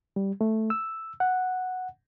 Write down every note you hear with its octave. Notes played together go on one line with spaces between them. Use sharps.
G3
A3
E6
F#5